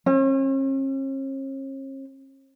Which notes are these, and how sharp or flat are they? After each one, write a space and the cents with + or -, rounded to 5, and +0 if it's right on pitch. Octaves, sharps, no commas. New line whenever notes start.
C#4 -45